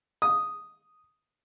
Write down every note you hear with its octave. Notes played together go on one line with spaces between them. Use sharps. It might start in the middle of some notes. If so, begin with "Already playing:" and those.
D#6